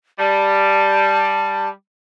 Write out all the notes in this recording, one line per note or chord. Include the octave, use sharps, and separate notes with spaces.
G3 A5